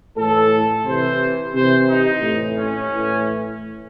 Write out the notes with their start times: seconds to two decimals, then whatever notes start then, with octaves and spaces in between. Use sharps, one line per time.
0.17 A2 E3 A4
0.85 C3 E3 C5
1.53 C3 E3 C5
1.88 D#4
2.21 A2 E3
2.56 C#4
2.90 A2 E3